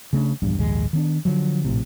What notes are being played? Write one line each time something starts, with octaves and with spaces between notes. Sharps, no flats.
C#3 A3 C#4 D4
A#1 E2 G2
A#1 D#2 G#2 G#3
D#3 B3 D4
D3 F3 F#3
A#1 A2 C3